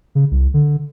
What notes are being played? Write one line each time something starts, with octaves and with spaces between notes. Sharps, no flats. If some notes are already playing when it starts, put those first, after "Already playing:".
C#3
C2
D3